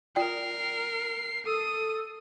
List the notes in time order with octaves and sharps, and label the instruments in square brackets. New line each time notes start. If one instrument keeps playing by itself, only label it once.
[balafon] F4 D5 G5 [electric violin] A#4 C7
[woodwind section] A4 [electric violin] D#6